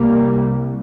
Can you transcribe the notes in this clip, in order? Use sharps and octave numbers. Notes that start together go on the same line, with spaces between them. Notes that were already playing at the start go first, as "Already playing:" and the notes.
Already playing: C2 C3 G3 A#3